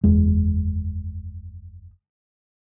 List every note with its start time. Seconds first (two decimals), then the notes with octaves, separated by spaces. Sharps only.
0.04 F#1 E2 G#3